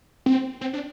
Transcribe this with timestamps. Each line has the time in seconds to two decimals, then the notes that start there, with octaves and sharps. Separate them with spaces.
0.26 C4
0.61 C4
0.73 D4